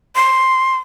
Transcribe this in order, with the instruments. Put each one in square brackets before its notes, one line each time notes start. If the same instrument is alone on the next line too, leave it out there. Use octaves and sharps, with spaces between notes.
[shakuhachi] C6